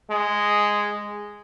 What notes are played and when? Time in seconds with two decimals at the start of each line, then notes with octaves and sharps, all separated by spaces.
0.10 G#3